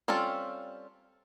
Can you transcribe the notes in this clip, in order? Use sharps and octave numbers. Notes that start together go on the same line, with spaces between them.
G3 C4 C#4 F4 A4